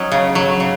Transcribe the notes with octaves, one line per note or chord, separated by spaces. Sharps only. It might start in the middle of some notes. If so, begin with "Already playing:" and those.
Already playing: F#3 C#4 D#4
C#3
F#3
C#3